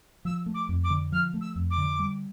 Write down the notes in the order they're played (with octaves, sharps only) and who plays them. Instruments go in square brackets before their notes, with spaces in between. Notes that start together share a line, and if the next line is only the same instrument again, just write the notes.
[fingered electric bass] F3 [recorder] E6
[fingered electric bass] A3
[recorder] D6
[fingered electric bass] F2
[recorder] D6
[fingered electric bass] D3
[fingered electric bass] F3 [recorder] F6
[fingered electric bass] A3
[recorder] E6
[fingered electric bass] F2
[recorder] D6
[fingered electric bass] D3
G3